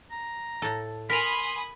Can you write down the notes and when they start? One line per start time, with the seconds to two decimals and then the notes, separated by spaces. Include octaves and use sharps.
0.11 A#5
0.62 A2 A4
1.10 A#4 G#5 B5 C6 D#6 B6 F7